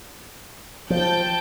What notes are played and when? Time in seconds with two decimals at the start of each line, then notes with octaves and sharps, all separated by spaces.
0.90 F3 G5 A5 G6